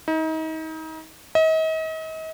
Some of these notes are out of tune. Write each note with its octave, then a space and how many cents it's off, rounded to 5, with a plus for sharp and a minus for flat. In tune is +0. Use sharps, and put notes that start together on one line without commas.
D#4 +35
D#5 +40